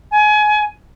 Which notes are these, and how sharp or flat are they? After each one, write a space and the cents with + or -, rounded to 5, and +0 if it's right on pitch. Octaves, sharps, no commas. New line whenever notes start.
G#5 +25